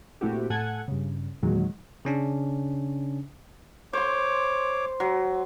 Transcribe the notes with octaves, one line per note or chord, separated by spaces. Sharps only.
A#2 A3 C4 E4 F#4 G4
A2 A4 F#5 G#5 G#6
G2 C#3
E2 A#2 D#3 F#3 G#3
C#3 C#4 D4
C5 C#5 C6 D6
F#3